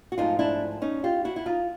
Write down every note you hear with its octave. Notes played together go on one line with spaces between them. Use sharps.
F#4
G#2 F3 A3 D#4 F4
D4 E4
C#4 D#4
F4 G4
E4 F#4
E4
D#4 F4